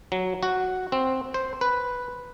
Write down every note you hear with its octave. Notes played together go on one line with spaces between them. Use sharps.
F#3
F#4
C4
C5
B4